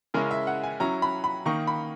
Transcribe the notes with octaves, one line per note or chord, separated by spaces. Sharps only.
C#3 G#3 C#4 E4 A#4
E5
F#5
G#5
F#3 C#4 E4 A#5
B5
B5
D#3 A#3 D#4 C#6
B5